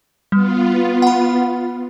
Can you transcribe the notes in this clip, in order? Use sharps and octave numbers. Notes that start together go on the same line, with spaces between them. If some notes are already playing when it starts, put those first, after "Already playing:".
G3 B3 F4
F#5 B5